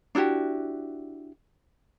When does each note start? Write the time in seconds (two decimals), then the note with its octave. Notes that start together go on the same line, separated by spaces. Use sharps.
0.15 D4 E4 F#4 G4